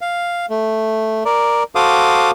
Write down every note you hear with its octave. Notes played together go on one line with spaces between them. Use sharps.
F5
A3
A#4 D5
F#4 A4 C5 F5 D6 D#6